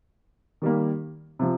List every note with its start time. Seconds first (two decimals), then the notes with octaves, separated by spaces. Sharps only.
0.62 D#3 G3 A#3
1.39 C3 F3